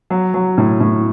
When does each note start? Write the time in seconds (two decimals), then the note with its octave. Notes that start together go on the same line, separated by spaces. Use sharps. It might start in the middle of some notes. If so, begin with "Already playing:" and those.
0.10 F#3
0.34 F#3
0.58 A2
0.80 A2